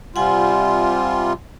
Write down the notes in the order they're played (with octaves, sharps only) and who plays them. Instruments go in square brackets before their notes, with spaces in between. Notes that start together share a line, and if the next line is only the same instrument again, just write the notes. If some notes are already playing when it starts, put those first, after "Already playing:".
[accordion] C3 G3 F4 [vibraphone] F#5 G#5